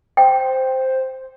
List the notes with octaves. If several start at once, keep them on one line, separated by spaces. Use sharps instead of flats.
C5 G5